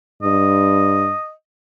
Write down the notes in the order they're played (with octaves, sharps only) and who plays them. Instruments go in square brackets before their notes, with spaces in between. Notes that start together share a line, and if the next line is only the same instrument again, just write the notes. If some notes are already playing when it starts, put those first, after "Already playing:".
[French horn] G2 [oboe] D#5